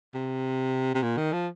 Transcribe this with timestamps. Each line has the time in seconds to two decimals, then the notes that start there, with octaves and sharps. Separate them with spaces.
0.14 C3
0.94 C3
1.03 A#2
1.17 D#3
1.33 F3